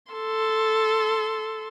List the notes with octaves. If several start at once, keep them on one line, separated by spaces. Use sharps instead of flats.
A4 C6